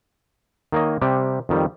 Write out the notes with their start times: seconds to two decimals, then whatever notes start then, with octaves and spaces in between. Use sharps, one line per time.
0.72 D#3 A#3 C#5 D#5
1.01 C3 G3 G4
1.49 F2 D#3 G3